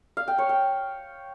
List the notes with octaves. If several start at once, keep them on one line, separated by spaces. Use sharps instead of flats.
F5
G5
C#5
G5